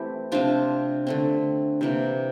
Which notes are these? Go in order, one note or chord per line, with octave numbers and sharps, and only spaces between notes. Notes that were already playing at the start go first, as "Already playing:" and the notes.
Already playing: E3 A3 C4 E4 G4
C3 F3 C4 D4 F4
D3 A3 C4
C3 E3 A#3